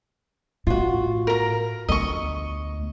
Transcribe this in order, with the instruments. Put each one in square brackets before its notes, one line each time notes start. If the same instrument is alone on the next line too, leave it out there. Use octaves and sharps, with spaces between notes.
[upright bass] A2 [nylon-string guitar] F4 F#4
[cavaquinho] A#4 A#5
[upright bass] D2 B3 [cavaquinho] D#5 C#6